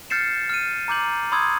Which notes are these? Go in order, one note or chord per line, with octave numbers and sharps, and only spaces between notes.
F6 G6 A6 C7 C#7 E7
F6 D#7
A#5 D6 G6 F#7
B5 C6 D#6 E6 G#6